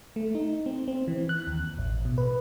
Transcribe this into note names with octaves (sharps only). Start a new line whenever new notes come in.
A3
D#4
C4
C4
E3
F#6
D#2
A1
B2
B4